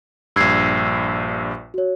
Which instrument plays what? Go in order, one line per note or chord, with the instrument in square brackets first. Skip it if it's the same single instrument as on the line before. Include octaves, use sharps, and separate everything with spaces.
[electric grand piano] A#1 G2 [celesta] E6 G#6 C7
[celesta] F#4 C#5